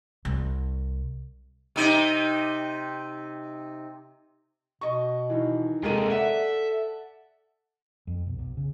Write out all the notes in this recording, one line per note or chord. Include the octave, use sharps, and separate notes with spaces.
C2
C3 D#4
B2 D#5 C#6
D#3 E3
D#2 C3 G#3 A4 A#4 D#7
D5 E5 F#5
F2
B1
B1
C#3